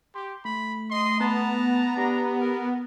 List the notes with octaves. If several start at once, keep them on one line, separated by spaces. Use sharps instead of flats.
G4 C6
A3 B5
D#5 C6
B3 A5 A#5
D4 G4
A#4